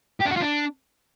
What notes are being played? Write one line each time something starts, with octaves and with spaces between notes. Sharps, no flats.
G4
D4
F#4
F4
D4